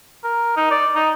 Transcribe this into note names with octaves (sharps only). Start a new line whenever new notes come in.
A#4
D#4
D5
D#4